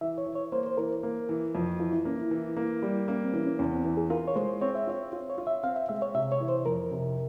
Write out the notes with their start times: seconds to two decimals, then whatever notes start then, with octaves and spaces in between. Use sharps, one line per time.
0.01 E3 E5
0.18 C#5
0.26 E3
0.35 C#5
0.52 A#3 C5
0.66 C5
0.78 E3 A#4
1.03 A#3
1.29 E3
1.55 F2 F4
1.80 E3 F4
1.93 E4
2.05 A#3 C#4
2.19 E4
2.31 E3
2.57 A#3
2.82 G3
3.08 A#3 C#4
3.24 C4
3.34 E3 C#4
3.46 C#4
3.59 E2 C#4
3.72 C4
3.84 E3
3.97 G#4
4.10 F4 A#4
4.28 C#5
4.36 G#3 C5
4.61 C4 C#5
4.75 E5
4.87 F4 C#5
5.13 F4
5.29 C#5
5.38 F4
5.47 E5
5.63 C4 F5
5.76 E5
5.89 G#3 E5
6.02 C#5
6.15 C3 E5
6.32 C#5
6.40 E3
6.49 C5
6.66 F2 A#4
6.91 C3